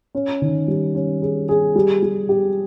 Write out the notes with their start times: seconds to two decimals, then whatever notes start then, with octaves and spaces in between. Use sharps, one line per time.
0.15 C#4
0.42 D#3
0.68 G3
0.95 C#4
1.22 G#4
1.49 G#4
1.76 G3
2.02 G3
2.29 G4